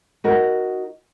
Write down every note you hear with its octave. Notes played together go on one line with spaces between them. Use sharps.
D#4 F#4 A#4